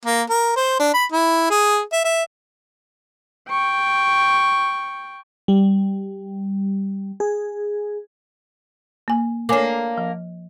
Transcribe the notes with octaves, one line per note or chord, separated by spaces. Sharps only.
A#3
A#4
C5
D4
B5
E4
G#4
E5
E5
G5 C#6
G3
G#4
A#3 G#5
A#3 D4 C#5 G#5 D6
F3